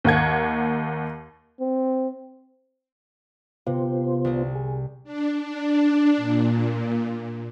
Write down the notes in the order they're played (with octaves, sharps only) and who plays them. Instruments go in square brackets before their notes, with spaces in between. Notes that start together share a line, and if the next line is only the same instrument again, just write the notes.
[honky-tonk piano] D#2 A#3 F#5 G#6
[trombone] C4
[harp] C3 [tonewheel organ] B3 F4 C5
[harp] C2 C4
[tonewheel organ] G#4
[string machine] D4
D4
A#2